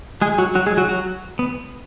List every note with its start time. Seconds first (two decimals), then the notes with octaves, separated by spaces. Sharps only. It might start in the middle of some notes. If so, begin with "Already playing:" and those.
0.21 G#3 G#4
0.38 F#3 F#4
0.55 F#3 F#4
0.66 G#3 G#4
0.77 F#3 F#4
0.88 F#3 F#4
1.39 B3